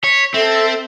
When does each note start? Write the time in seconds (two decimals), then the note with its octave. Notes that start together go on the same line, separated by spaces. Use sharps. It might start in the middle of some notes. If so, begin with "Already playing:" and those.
0.04 C#5 B6
0.34 C4 A4 E5